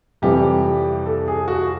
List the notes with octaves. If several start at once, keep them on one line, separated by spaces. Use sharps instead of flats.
F2 C3 E3 G3 G4
A4
G#4
F#4